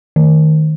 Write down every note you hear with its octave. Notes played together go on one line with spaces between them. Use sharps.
D#3